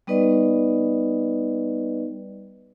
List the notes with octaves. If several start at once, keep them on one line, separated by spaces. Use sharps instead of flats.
G3 B3 D#4 B4 D5 D#5